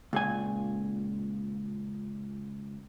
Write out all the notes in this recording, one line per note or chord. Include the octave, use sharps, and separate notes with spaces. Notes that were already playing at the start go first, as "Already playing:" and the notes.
C#2 A#2 G#5